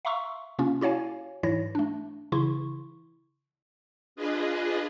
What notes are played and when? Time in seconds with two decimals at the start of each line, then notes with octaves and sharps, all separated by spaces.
0.05 E5 F5 A#5 C6 C#6 E6
0.59 C3 A#3 C#4 F4
0.81 E4 F#4 C#5 F5 G#5
1.43 G#2 E3 E4 C#5 A#6
1.75 A3 D4
2.32 C#3 E3 E4 C6 C#6
4.16 D4 F4 G#4 B4 D#5